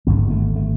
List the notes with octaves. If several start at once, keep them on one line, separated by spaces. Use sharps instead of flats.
G#1 G2 D3 B3
A3
A3